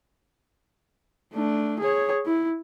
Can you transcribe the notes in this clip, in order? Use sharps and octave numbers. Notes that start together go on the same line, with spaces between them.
A3 D4
G#4 C#5
E4